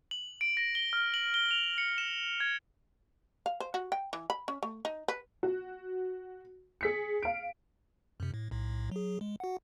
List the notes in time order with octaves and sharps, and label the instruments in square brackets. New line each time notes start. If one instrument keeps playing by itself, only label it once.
[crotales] F#7
D7
A#6
G7
F6
F#7
G7
F7
C#7
E7
G#6
[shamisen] F5
C5
F#4
G5
E3
B5
C#4
A3
D#4
B4
[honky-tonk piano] F#4
G#4 B6 C#7
F5 D7
[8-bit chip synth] F#2 C3
A2
B1 A2
F#3 G#4
G#3
F#4 F#5